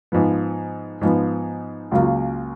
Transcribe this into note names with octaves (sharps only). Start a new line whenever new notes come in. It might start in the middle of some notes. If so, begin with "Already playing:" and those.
G#2 F3 B3
G#2 F3 B3
C#2 C#3 F#3 A#3 F4